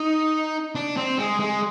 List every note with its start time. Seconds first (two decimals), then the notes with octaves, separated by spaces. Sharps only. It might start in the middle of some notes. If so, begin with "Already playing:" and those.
Already playing: D#4
0.75 D4
0.97 C4
1.19 G#3
1.40 G#3